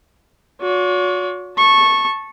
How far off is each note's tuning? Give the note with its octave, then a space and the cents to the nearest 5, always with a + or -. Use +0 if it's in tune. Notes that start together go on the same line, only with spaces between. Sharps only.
F#4 -40 C#5 +45
A5 +0 C#6 -15